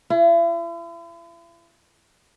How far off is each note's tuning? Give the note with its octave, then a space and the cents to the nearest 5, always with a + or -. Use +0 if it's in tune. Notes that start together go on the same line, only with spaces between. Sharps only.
E4 +45